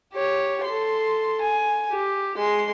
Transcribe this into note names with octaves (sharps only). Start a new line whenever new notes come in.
G4 C#5
A4 C6
G#5
G4
G#3 C6